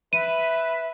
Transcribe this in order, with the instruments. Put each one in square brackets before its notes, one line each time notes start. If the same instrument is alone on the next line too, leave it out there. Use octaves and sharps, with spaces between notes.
[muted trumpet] B4 [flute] E5 [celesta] D#7